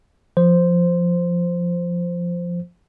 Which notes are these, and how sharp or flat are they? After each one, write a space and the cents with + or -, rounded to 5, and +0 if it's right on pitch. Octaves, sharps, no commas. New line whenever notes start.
F3 +0 C5 -5